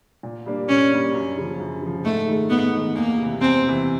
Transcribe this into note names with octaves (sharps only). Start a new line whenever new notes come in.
A#2
G3 A#3 D4
A#2 C#4
G3 A#3 D4
F#2
C#3 F3
F#2
C#3 F3
G#2 A3
D#3 G#3
G#2 B3
D#3 G#3
E2 A#3
C3 E3
E2 C4
C3
E3